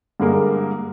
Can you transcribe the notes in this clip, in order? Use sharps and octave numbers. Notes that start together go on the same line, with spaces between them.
G2 D3 G#3 A#3